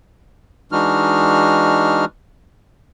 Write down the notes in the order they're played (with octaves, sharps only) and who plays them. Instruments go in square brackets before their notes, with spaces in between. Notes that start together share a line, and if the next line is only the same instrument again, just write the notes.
[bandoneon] E3 G#3 D4 D#4 F#4 F6